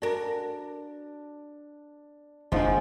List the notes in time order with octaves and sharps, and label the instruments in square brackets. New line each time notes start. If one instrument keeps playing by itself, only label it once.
[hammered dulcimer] D4 [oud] F#4 A#4
[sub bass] F#1 [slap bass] D#2 D4 [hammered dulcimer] G#2 F4 [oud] F3 C4